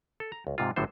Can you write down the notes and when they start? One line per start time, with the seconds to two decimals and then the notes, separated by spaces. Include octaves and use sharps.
0.20 A4
0.32 A#5
0.47 C#2
0.58 G#2 C3 F4
0.76 G1 A2 D3 F#3 A4 C5